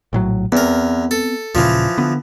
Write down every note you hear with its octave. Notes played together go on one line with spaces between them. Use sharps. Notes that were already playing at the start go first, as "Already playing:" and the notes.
A#1 A2 F#3
E2 B3 C4 A#4
A4
D#1 A#2 C#3 E3 F3
D3 B3